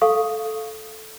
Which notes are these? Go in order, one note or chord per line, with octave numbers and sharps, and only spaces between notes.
A4 F5 C#6 D#6